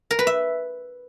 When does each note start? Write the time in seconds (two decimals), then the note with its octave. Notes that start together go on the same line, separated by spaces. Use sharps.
0.11 A#4
0.19 B4
0.27 E5